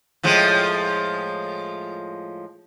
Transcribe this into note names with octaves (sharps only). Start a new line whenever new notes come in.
A2 F3 G#3